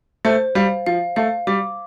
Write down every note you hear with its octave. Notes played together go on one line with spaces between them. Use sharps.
A3 C5
G3 F5
F3 F5
A3 F5
G3 D6